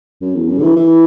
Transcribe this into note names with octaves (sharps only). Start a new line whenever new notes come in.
F#2
E2
F#2
D3
E3
E3